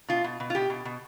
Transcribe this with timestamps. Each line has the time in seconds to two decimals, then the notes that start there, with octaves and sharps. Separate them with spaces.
0.08 B2 F4
0.24 B2
0.40 B2
0.50 F4
0.55 B2 G4
0.70 B2
0.85 B2